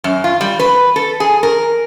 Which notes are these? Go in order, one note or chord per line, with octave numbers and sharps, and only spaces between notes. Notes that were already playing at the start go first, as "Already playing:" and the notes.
F#2
F4
G3
B4
A4
G#4
A#4